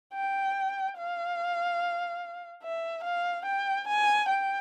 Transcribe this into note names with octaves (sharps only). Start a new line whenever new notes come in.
G5
F5
E5
F5
G5
G#5
G5